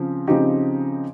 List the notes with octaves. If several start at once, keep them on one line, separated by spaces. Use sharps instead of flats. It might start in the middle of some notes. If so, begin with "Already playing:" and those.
Already playing: C#3 F3 C4
C#3 F3 C4 D#4 G4